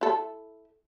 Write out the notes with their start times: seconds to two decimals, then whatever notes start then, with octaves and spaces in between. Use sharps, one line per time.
0.01 E4 A4